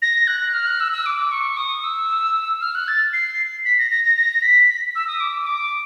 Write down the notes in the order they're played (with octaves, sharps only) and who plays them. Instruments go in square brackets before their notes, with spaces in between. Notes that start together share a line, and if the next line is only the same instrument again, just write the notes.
[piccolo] A#6
F#6
F6
F#6
E6
E6
D6
C#6
D#6
E6
F6
F#6
A6
C7
B6
A#6
A#6
A#6
A#6
B6
B6
E6
D#6
D6
D#6
D6